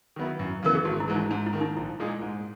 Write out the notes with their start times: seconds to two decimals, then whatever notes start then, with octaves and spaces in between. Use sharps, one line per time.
0.16 D#3 F#3 B3 E4
0.39 F#2
0.63 C#3 E3 B3 A#4
0.75 G#4
0.85 G#1 F#4
1.00 E4
1.08 G#2 E3 G#3
1.15 D#4
1.31 G#2 D#4
1.46 E4
1.53 D#3 A#3
1.61 D#4
1.76 A#1 E4
2.00 A#2 G#3 D#4 G#4
2.22 G#2